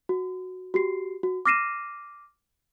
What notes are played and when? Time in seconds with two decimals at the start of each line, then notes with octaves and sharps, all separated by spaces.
0.09 F#4
0.74 F#4 G4 C7
1.23 F#4
1.45 D6 F6 A#6 C7 D#7 E7